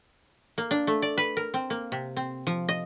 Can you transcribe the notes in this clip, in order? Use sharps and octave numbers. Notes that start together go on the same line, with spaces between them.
A#3
D4
A3
D5
B4
A#4
C4
A#3
C3
C4
F3
D#5